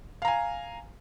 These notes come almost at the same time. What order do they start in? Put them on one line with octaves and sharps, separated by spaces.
F5 A#5 G#5